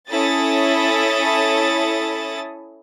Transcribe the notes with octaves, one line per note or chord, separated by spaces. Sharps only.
C#4 E4 A4 D#6 A6